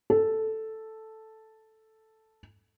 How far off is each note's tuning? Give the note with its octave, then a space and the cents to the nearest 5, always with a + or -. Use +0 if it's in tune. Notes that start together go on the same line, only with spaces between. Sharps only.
A4 +0